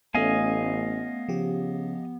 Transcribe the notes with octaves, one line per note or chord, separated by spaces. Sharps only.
A1 A3 B3 C#4 D#5 F5 G#5
C#3 F3 G4